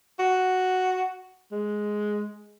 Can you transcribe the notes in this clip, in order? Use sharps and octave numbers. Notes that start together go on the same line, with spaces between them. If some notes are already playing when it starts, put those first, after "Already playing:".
F#4
G#3